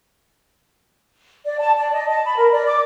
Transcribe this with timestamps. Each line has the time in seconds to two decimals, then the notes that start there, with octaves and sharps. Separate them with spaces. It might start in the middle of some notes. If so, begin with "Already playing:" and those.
1.46 D5
1.58 A5
1.77 D5
1.93 D#5
2.09 A5
2.25 B5
2.37 A#4
2.52 D5
2.66 D6